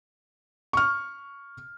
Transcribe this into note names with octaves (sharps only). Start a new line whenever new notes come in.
C#6 F6